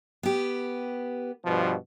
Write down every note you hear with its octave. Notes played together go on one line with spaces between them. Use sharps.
B3 G4
G2 B2 F3